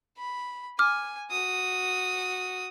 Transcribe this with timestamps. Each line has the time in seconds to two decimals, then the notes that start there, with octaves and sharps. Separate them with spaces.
0.18 B5
0.79 G#5 D6 F6
1.31 F#4 D#6